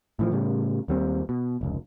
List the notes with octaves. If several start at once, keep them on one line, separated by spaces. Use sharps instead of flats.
A2 E3 F3
A2 C#3 G3
D#2 G3 C4
B2
F1 C#2